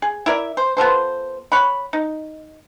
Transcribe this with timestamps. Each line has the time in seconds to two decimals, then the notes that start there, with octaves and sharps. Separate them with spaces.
0.02 G#4
0.26 E4 A#4 D5 E5
0.57 C5
0.77 B3 F4 A4 C5
1.52 C#5 F#5 B5
1.93 D#4